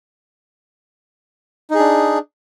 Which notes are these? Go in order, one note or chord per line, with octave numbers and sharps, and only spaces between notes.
D4 D#4 G#4